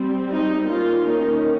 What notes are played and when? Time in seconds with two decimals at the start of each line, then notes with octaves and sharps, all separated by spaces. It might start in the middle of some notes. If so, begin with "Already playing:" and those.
Already playing: G3 C4
0.32 D#4
0.68 D#3 A#3 C#4 F4
1.06 D#4